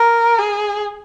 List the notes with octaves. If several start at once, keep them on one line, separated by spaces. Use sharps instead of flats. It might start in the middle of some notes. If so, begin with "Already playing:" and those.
Already playing: A#4
G#4